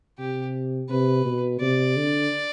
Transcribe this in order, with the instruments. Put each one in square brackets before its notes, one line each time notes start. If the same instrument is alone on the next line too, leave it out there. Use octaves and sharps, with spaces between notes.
[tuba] C3 [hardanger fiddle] G4
[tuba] C3 [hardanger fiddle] B4
[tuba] B2
[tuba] C3 [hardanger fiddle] D5
[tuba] D3